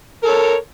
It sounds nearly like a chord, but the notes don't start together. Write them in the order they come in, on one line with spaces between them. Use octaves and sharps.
A#4 A4 C#5